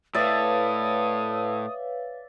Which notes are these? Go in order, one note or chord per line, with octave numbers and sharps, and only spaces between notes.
A2 B4 C#5 D5 E5 F5 D#6